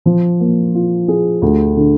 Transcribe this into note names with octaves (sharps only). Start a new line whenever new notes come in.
F3
A#3
F4
G#4
D2
D3